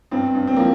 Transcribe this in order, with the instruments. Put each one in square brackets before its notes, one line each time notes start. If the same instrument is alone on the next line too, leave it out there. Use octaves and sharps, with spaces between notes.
[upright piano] G2 C4
G2
C4
F3 A#3